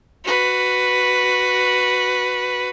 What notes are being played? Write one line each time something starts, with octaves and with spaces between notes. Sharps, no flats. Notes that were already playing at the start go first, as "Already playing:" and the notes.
F#4 B4